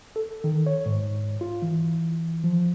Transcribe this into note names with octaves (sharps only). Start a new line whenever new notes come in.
A4
D#3
C#5
G#2
F4
E3
F3